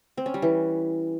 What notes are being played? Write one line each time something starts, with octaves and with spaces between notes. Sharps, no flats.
C4
C#4
G3
E3